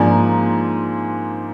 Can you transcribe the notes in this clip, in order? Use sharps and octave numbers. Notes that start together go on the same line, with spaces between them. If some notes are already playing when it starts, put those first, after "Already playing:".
Already playing: G#2 F3 A#3 D4 G#5